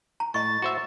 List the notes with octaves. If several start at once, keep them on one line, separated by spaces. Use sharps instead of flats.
A#5
A2 D#5 C#6 A6
F#4 C5 E5